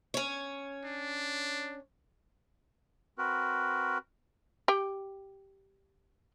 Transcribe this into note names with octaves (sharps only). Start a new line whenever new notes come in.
C#4 C#5
D4
C4 F#4 A#4 B4
G4 G5